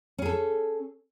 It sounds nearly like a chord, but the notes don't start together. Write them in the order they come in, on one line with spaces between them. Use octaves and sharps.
C#4 G#4 A4